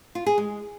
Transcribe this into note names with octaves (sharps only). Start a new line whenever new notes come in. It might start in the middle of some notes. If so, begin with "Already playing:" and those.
F4
G#4
G#3